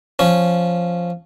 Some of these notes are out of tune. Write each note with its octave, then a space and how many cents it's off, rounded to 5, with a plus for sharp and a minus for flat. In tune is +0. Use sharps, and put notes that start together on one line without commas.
F3 +0 C#4 +0